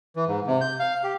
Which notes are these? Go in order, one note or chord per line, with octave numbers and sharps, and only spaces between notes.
E3
G#2
C3
G6
F5
G4